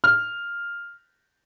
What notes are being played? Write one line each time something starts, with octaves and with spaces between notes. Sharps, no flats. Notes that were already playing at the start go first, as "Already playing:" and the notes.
F6